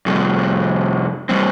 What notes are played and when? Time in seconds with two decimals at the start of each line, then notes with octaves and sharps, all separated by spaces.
0.06 F2 C3 G3
1.29 E3 G3 C4